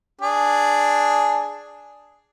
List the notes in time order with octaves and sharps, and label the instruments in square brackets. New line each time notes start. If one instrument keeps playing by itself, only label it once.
[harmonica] D4 G#4